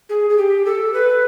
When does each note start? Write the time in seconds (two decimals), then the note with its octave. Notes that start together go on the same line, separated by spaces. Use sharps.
0.09 G#4
0.30 G#4
0.37 G4
0.65 A4
0.93 B4